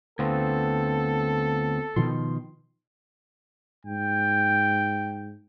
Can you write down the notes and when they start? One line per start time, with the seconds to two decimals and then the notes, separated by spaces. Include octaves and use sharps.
0.19 D2 B3 C4 F4 A4
1.96 B2 D#3 F3 C6
3.85 G#2 G5